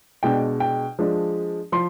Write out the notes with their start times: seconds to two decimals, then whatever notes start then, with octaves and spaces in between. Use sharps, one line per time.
0.23 B2 G#3 D4 G5
0.60 G5
0.99 F3 G#3 D4
1.72 F3 C6